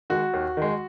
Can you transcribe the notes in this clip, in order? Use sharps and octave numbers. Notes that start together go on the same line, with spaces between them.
D#3 G#3 F#4
D#2
D#3 G#3